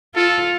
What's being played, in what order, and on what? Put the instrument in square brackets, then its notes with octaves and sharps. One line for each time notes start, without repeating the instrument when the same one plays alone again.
[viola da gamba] F4 [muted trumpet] A4